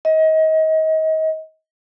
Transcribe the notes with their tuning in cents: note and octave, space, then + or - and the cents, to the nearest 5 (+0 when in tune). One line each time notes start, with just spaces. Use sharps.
D#5 +30